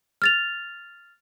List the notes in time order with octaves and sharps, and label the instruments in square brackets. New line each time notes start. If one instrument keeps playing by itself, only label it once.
[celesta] F6 A6 F7